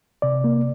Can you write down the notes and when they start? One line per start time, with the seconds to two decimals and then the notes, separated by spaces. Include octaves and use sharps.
0.22 C3 D5
0.44 A#3